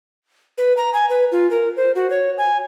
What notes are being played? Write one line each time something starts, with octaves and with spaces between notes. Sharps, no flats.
B4
A#5
G#5
B4
F4
A#4
C5
F#4
C#5
G#5